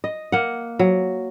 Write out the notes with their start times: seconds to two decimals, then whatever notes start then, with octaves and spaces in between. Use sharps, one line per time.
0.04 D#5
0.32 A#3 F#5
0.79 F#3